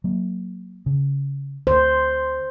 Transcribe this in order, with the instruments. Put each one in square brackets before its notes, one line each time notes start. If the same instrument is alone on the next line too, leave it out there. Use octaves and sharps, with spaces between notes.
[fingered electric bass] F#3 A#3
C#3
[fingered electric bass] D2 [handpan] C5